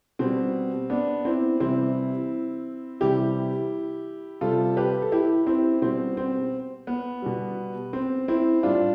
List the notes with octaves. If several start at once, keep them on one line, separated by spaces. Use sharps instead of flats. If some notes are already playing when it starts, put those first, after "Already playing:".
B2 G3 C4
B3 D4
C4 E4
C3 E3 G3 C4 E4
C3 E3 G3 E4 G4
C3 G3 F4 A4
G4 B4
A4
E4 G4
C4 E4
B2 G3 C4
C4
B3
B2 G3
C4
C4 E4
A2 G3 D4 F4